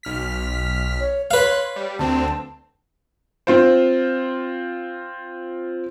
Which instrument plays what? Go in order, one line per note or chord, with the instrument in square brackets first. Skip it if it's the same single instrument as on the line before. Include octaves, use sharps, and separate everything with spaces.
[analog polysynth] B1 F6 B6
[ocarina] C#5
[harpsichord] B4 F5 [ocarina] C#5 [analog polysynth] C6 F#6
[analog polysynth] G3
[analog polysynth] D2 C4 [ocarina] A5
[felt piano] C4 F4 C5